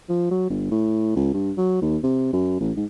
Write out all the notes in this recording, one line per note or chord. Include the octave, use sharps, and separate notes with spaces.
F3
F#3
G1
A2
C#2
G2
F#3
D#2
C3
F#2
A1
G#2